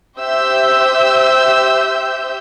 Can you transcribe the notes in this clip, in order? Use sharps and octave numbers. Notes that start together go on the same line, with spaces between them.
G4 C5 E5 E6 G6